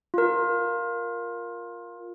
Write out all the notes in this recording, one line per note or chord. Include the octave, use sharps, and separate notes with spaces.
F4 A#4